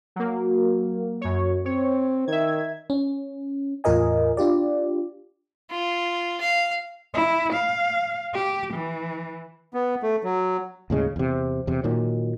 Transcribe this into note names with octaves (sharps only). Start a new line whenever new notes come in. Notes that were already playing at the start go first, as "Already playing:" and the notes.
F#3 A#3
F#2 C#5
C4 C#5
D#3 E5 G#6
C#4
E2 A2 F4 A#4 D#5 G#5
D4 F4 G4 D5
F4
F5
E4
F5
G4
E3
B3
A3
F#3
D#2 A2 C#3 G#3
E2 C3
E2 C3
A#2 D#3 F#3